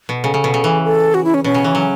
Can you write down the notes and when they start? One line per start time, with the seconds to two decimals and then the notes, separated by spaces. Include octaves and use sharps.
0.09 B2
0.24 C#3 A4
0.34 C#3
0.44 B2
0.54 C#3
0.64 E3
0.84 A4
1.14 F#4
1.24 E4
1.34 C#4
1.44 B2 C#4
1.54 C#3
1.64 E3
1.75 F#3